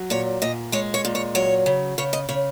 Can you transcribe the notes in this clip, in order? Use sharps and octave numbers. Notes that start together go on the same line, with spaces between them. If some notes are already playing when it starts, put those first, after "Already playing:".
Already playing: F#3
A#2 C#5
A#2 D#5
G#3 C#5
C#5
A#2
C#5
F#3 C#5
C#3
C#3 C#5
D#5
C#3 C#5